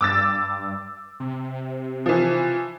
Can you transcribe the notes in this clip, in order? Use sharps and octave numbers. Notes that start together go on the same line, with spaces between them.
G2 D6 E6 A6
C3
E3 F3